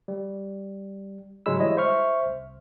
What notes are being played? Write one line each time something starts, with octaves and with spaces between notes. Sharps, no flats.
G3
G#2 C#3 F#3 G#3 B5 E6
E3 G3 G#3 E4 C#5 D#5
C5 E5 C#6 F6
C2